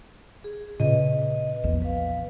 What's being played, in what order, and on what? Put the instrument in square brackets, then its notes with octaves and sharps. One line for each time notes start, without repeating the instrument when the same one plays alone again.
[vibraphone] G#4
[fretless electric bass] A#2 C#3 [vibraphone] B4 D#5
[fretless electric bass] A#1 E2
[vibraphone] B4 F5